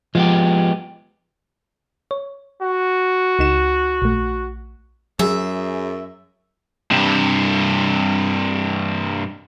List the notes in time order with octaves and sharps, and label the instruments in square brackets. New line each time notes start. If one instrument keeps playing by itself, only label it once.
[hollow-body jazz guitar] F3 [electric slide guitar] G#3 B3 G4
[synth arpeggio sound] C#5
[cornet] F#4
[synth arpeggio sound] C#2 D#4 E7
A#1 A3
[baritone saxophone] F#2 [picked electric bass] F#3 [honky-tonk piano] G#4 [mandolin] E5
[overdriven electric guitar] G2 C3